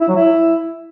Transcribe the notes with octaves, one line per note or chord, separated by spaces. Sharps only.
E4
F#3
E4